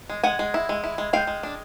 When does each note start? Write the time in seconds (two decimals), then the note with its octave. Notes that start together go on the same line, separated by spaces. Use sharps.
0.10 G#3
0.23 G#3 F#5 G#5
0.39 G#3
0.54 E4
0.69 G#3
0.84 E4
0.98 G#3
1.13 G#3 F5 G5
1.27 G#3
1.43 D4